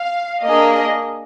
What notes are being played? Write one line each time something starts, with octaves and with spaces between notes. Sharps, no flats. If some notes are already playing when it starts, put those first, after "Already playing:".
Already playing: F5
A#3 D4 G#4 D#5